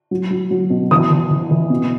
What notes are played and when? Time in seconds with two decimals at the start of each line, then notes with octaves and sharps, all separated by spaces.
0.11 F#3
0.31 F#3
0.51 F#3
0.70 B2
0.91 E3 D#6
1.11 E3
1.31 E3
1.51 E3
1.70 B2